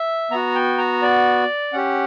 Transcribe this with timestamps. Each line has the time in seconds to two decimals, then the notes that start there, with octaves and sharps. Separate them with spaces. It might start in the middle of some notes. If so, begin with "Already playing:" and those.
Already playing: E5
0.31 B3 F#4 A#5
0.55 G5
0.78 A#5
1.02 D5
1.73 C#4 G4 F#5